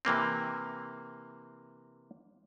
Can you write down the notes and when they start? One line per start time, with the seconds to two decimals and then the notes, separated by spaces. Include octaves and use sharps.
0.05 C3 E3 A#3 C4